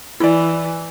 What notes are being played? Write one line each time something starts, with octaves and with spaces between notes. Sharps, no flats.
E3 E4 D5